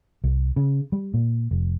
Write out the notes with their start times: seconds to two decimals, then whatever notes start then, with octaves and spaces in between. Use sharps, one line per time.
0.24 C2
0.56 C#3
0.92 G3
1.14 A#2
1.51 F1